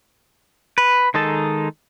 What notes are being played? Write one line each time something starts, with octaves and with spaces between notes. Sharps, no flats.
B4
D#3 G#3 D#4 A4 A5